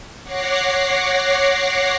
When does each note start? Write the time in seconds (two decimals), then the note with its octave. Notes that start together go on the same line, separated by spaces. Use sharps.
0.23 C#5 F#5 D6 A#6 C7